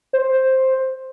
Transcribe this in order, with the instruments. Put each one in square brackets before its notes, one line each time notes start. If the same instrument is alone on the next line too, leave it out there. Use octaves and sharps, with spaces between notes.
[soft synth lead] C5